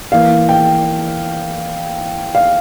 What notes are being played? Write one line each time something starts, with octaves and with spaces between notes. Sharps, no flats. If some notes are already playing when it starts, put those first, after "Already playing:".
E3 A#3 F5
G5
F5